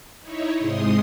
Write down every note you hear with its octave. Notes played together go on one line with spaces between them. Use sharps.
D#4 E4 C#5
G#2 C3 G#3 C6 D#6